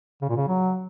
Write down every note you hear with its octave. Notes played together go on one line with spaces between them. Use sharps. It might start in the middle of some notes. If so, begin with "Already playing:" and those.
C#3
A#2
C#3
F#3